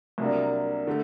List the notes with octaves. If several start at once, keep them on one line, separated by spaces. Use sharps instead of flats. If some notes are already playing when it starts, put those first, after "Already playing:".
C2 C3 F#3 A#3 D4
D3 A3